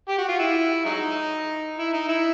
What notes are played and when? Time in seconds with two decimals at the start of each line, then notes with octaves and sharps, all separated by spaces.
0.08 G4
0.18 F#4
0.28 F4
0.40 E4
0.85 F#3 G#3 D#4
1.78 E4
1.93 D#4
2.09 E4